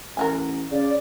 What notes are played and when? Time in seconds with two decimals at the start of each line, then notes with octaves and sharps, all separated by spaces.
0.17 A1 A#4 F#5 G#5
0.72 C#3 D5